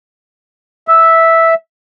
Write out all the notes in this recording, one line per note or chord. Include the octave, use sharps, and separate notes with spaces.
E5